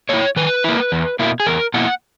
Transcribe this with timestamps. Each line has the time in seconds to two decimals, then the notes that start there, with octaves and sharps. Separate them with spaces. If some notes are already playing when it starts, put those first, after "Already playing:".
0.09 A#3 E4 C#5
0.36 D#3 B4
0.64 A#3 E4
0.92 E2
1.19 B2 A#3 E4
1.40 G#4
1.47 E2 A#4
1.74 B2 A#3 E4 F#5